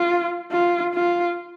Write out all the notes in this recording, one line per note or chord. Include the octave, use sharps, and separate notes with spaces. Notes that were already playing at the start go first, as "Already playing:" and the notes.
Already playing: F4
F4
F4